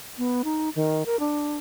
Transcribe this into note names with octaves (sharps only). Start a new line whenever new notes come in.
B3
D#4
D#3
A#4
D4